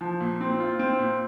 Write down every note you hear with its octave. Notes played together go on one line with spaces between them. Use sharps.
F3
A#2
C4
F4
C4
A#2